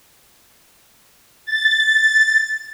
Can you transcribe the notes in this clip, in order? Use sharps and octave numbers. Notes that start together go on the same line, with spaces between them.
A6